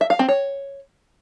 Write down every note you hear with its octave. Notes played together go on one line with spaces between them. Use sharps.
E5
F5
C4
C#5